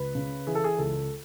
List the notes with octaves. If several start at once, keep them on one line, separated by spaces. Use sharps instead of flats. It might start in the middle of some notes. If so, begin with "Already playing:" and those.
Already playing: C#2 B4
C#3
E3 G#4
A4
G#4
C#2 A4